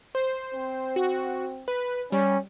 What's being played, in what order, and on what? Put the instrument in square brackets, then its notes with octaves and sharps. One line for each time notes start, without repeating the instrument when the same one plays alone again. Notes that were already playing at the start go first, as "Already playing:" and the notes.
[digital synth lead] C5
[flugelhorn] C4
[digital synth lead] F#4
B4
[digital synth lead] G3 [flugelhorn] C#4